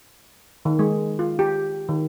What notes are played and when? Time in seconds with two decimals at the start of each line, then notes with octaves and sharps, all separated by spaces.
0.65 D#3
0.79 G#3
1.19 F4
1.39 G4
1.89 D#3